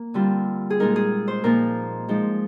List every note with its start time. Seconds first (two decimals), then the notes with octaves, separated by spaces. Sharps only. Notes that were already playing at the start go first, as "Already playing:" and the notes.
Already playing: A#3
0.14 D3 G3 C4 F4
0.70 G#4
0.80 A#2 G#3 C4 D#4 A#4
0.96 G#4
1.28 C5
1.44 A#2 F3 A#3 D#4 A#4
2.09 F3 G#3 D#4